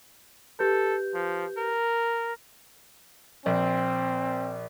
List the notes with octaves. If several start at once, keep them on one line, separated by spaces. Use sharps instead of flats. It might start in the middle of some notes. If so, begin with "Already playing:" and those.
G4 A4 B4 G6
F3
A#4
A#1 C4